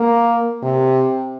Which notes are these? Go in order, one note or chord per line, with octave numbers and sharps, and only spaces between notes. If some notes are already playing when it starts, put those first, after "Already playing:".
Already playing: A#3
C3